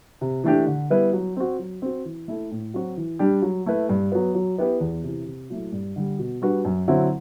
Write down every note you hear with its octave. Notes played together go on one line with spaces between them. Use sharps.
C3
E3 A3 D4 G4
D3
G3 B3 E4 B4
F#3
C4 F#4
F#3
C4 F#4
E3
A3 E4 A4
A2
F#3 C4 F#4
E3
G3 D4 G4
F#3
A3 E4 B4
G2
F#3 B3
F#3
B3 E4 G4 B4
E2
C3 E3
C3
F#3 A3 E4
G2
D3 G3
B2
G3 D4 F#4 B4
F#2
D3 F#3 C4 E4